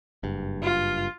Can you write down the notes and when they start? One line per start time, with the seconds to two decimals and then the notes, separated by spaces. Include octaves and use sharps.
0.23 F#1 G2
0.63 F4